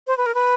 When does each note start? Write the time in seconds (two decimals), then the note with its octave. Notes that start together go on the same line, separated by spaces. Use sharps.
0.07 C5
0.18 B4
0.26 A#4
0.35 B4